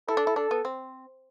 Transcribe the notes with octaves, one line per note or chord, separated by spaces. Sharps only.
E4 A4
D4
E4
D4 A4
B3
C4